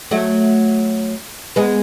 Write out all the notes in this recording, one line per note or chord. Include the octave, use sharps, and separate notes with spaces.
F#3 A3
G#3 B3